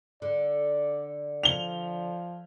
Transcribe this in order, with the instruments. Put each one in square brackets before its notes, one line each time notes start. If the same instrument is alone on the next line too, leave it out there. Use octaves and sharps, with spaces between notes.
[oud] D3 [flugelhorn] D5
[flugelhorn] F3 [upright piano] F7 G7